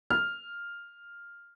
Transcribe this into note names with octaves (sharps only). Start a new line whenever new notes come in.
F6